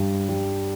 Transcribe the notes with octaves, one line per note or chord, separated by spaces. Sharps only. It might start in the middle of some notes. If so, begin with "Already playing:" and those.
Already playing: G2 G3
G3